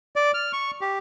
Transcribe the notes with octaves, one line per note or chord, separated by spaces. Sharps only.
D5
F6
C#6
G4